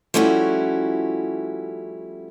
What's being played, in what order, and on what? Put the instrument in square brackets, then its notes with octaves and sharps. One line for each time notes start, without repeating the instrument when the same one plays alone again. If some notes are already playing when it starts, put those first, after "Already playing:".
[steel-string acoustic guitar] F3 G3 A3 C#4 E4 F#4